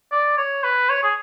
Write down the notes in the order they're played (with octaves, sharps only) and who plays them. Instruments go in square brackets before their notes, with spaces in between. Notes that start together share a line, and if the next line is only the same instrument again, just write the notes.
[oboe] D5
C#5
B4
C#5
G#4